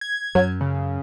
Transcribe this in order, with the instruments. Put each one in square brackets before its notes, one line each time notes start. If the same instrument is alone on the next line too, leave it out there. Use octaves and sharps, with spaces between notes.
[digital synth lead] G#6
[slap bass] F#2 [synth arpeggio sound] F#3
[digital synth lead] C#3